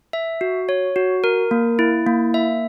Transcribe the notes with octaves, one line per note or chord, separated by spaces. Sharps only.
E5
F#4
C#5
F#4
A#4
A#3
E4
A#3
E5